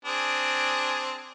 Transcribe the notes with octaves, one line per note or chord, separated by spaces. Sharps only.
C4 D4 G#4